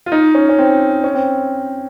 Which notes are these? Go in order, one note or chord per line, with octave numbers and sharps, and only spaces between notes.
F4
D#4
C#4
C#4
C4
C#4
C4